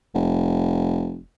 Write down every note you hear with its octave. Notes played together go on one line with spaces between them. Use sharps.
F1